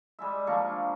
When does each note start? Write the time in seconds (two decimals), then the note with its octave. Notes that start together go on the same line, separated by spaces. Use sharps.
0.19 G3 G#3 E5
0.47 F3 A#3 D4 C#6